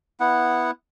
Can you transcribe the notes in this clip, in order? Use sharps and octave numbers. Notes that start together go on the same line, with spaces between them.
B3 E4 F#5